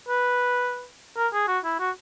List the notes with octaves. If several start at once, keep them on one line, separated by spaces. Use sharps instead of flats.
B4
A#4
G#4
F#4
E4
F#4